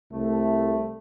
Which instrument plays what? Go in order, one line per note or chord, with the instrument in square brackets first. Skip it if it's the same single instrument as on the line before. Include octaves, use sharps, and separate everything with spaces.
[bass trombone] C2 [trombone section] A3